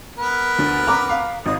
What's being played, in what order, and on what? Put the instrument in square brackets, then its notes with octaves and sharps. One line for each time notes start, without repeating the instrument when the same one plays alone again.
[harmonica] B3 A#4 B4
[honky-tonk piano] D2
A#5 D6
F5
[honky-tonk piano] G#1 [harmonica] D#5